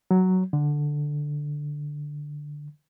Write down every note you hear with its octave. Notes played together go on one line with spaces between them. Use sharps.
F#3
D3